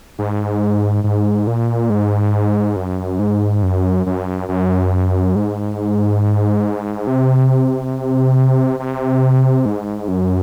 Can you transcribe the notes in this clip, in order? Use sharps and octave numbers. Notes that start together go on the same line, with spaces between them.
G#2
G#2
A#2
G#2
F#2
G#2
F#2
F#2
F#2
G#2
C3
C3
G#2
F#2